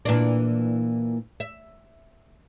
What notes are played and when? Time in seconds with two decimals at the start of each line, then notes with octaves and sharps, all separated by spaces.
0.05 A#2 E3 D4
1.40 E5